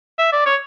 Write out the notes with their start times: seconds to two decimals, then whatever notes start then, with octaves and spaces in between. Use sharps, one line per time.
0.19 E5
0.33 D5
0.46 C#5